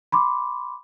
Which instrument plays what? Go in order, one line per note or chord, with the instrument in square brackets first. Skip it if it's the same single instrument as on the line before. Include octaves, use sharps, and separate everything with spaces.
[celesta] B5 C6 D6